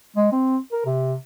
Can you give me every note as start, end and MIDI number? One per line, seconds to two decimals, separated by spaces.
0.17 0.29 56
0.32 0.57 60
0.72 0.84 70
0.86 1.16 48